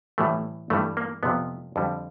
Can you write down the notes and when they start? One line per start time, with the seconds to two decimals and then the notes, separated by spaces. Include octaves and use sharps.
0.18 A2 E3 G3 A3
0.70 G2 E3 G3 A3
0.97 A#3
1.23 F2 C3 F3 B3
1.76 F2 D3 G3